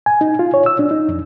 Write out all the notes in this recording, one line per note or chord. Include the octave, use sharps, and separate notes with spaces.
G#5
D#4
F4
C#5
E6
D4
D#4
F2